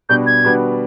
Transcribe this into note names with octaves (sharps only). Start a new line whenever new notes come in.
B2 G3 B3 D4 F#4 G6
G#6
B2 G3 B3 D4 F#4